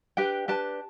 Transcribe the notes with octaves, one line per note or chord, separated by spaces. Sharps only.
D4 G4 B4 G5
D4 G4 B4 A5